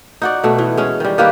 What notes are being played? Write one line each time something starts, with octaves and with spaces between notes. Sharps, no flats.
D#4 F#4 D5
B2 A3
E3
G#3 C#4
D#3 G3
D#3 A#3 G4 B4